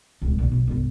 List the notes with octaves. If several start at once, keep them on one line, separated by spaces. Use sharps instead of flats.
D1 C#2
C2 B2
B1
G1 C2